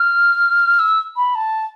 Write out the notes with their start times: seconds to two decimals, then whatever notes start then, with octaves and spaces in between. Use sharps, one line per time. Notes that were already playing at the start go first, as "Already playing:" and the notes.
Already playing: F6
0.79 E6
1.16 B5
1.35 A5